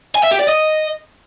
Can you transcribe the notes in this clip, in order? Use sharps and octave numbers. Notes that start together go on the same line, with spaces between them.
G#5
E5
G4
D5
D#5